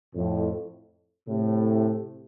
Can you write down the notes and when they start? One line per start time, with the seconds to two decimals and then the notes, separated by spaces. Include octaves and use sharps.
0.15 F2 A2
1.28 A2 C3